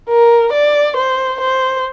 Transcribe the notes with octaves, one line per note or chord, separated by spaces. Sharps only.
A#4
D5
C5
C5